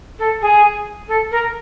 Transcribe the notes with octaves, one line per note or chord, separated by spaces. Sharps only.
A4
G#4
A4
A#4